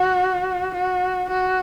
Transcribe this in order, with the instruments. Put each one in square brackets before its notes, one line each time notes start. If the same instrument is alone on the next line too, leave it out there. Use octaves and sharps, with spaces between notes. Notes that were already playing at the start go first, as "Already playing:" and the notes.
Already playing: [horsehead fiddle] F#4
F#4
F#4